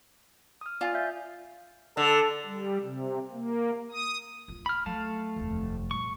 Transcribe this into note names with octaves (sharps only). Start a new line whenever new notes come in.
D#6 F6
F4 D5 G#5 A6
E5 F5 G6
D3 A4
G3
C3
A#3
D#6
D1 F4
B5 F6
F#3 A3 F5 A5
F1 D#2
A#2 G3 C#6